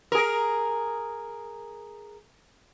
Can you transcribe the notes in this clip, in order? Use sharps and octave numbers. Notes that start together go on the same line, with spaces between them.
G#4 A#4